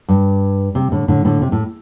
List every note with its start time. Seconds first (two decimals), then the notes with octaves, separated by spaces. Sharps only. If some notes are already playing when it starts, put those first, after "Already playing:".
0.09 G2
0.75 C3
0.92 A2 D3
1.08 A2 D3
1.25 A2 D3
1.42 C3
1.52 A2